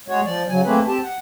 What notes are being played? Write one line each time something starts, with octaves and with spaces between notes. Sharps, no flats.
G#3 F#4 C#5
F3 D5
C#3 F#3 G#5
A3 A#3 C4 G#4 B4
C4 G4 A5
F#5